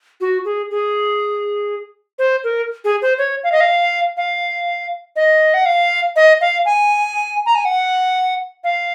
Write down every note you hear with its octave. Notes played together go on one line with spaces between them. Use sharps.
F#4
G#4
G#4
C5
A#4
G#4
C5
C#5
F5
D#5
F5
F5
D#5
F#5
F5
D#5
F5
G#5
A#5
G#5
F#5
F5